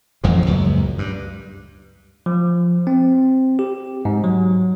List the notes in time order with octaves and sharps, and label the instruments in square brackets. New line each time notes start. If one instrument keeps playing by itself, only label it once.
[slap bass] A1 F2 E3 F3
C#2 F#2 A#2
G2
[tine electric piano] F3
C4
G4
G#2
F#3